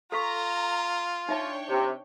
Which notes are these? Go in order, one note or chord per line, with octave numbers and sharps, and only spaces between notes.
F4 A4 F5 A#5 C#6
D4 D#4 C#5 E5 G5 A5
C3